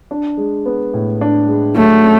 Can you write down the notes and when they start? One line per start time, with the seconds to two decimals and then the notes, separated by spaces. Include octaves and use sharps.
0.11 D4
0.37 G#3
0.66 B3
0.94 A2
1.21 D4
1.48 G#3
1.75 F#3 A3
2.03 C#4